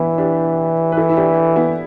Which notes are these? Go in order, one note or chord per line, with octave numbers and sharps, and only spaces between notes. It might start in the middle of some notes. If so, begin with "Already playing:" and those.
Already playing: E3 B3 D4 E4
D4 G4
B4
E4 A4
E4
D4 G4
B3 E4